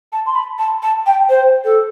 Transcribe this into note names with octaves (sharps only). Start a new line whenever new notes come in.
A5
C6
B5
A5
A5
G5
C5
A4